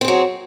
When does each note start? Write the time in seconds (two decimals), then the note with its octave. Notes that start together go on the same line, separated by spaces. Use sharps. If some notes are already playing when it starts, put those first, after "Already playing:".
0.01 C4
0.05 G#4
0.08 F#3